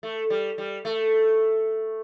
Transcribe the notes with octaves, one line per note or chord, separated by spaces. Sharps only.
A3
G3
G3
A3